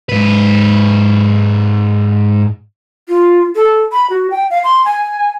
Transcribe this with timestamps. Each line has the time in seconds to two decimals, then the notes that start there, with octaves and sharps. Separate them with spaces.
0.09 G#2 B4
3.09 F4
3.55 A4
3.92 B5
4.10 F#4
4.31 G5
4.51 F5
4.64 C6
4.85 G#5